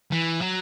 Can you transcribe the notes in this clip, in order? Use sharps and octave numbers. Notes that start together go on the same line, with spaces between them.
E3
F#3